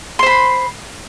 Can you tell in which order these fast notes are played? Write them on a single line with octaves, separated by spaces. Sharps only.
C6 C5 B5